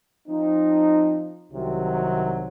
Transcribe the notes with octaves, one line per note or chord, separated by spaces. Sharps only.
F3 C4 D#4
C2 C3 D#3 F#3